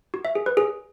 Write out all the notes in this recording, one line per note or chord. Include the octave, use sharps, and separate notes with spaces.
F#4
E5
G#4
B4
G#4